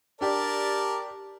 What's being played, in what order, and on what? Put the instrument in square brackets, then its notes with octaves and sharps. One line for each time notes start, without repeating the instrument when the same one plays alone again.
[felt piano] D4 G4 [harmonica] A#4 D5 A5